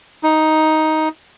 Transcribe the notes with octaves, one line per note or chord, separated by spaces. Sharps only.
D#4